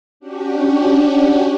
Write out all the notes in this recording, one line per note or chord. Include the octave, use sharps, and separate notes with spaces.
C#4 D4 F#4 G4